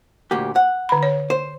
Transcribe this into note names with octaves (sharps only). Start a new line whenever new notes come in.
D2 A#2 G4
F#5
D3 B5
C#5
C5